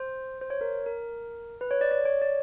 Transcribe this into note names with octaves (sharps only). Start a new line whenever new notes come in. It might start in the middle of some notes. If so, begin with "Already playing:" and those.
Already playing: C5
C5
C#5
A#4
A#4
B4
C#5
D5
D5
C#5
D5